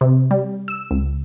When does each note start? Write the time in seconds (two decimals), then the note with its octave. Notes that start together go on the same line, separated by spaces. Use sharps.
0.01 C3
0.31 G3
0.68 E6
0.91 C#2